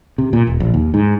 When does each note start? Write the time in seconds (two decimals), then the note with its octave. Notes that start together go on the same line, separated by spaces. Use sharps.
0.18 C3
0.33 A#2
0.47 D#1
0.60 A#1
0.74 D#2
0.94 G#2